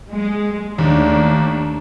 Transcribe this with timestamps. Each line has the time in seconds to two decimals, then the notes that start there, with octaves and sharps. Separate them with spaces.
0.11 G#3
0.78 D#2 A3 D4